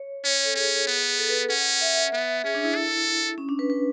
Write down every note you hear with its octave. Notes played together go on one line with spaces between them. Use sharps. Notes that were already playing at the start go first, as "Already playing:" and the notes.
Already playing: C#5
C#4 C#5
A4
C#4 G#4
B3
A4
B4
C#4 F#5
E5
B3
C#4 G#4
D4
E4
A4
C#4
D4
B4
B4